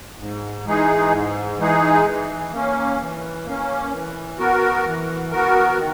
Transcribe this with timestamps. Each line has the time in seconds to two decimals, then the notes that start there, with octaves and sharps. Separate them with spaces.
0.19 G#2
0.66 E3 G#3 D#4 G#4
1.12 G#2
1.59 E3 G#3 D#4 G#4
2.05 E3
2.53 A#3 C#4
3.00 E3
3.45 A#3 C#4
3.92 E3
4.38 B3 F#4 A#4
4.86 E3
5.31 B3 F#4 A#4
5.78 D#3